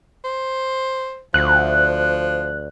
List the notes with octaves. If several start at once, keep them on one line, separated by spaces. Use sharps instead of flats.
C5
D2 F3 F#6